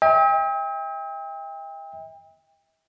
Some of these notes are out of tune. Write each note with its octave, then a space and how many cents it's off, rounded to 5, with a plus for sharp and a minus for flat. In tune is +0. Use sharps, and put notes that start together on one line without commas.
E5 -45 G5 +35